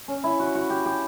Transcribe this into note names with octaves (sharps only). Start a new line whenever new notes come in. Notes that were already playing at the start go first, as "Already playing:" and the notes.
C#4
E4
F#4
F#4
G4
G4